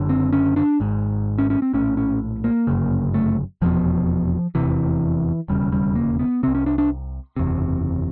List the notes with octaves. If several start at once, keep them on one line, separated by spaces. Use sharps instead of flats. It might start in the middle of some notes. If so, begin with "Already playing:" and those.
Already playing: F#1 F#2 D3
C4
C#4
D4
G#1 G#2
C#4
C#4
C4
A#1 A2 C#4
C#4
A#3
G1 F#2 C#3
A3
F1 E2 B2 F3
F1 E2 C3 E3
E1 D#2 C#3 G3
G3
A#3
B3
C2 C3 C4
C#4
D4
D4
F#1 E2 C3